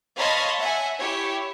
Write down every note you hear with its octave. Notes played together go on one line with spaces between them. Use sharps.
C#5 D#5 F5 A5 B5 C6
E5 F#5 G#5
E4 G4 C#5